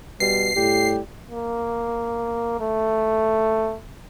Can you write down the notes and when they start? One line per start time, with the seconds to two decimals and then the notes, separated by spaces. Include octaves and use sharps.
0.20 B2 G3 C7
0.56 A2 G3 G4
1.31 A#3
2.61 A3